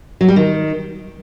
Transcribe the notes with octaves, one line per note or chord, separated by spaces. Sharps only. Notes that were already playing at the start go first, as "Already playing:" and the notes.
F#3
G3
D#3